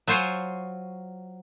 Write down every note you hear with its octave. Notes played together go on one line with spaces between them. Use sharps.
F#3 F4 C5 C#5 G#5